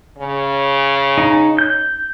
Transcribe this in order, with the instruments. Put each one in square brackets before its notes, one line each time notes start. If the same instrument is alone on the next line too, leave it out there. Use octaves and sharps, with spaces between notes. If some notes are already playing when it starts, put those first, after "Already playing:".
[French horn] C#3
[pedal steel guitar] D#4
G6